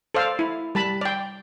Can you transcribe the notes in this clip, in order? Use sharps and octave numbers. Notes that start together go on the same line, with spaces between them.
A4 C5 D5 F5
E4
G3 A5 B5
D5 G5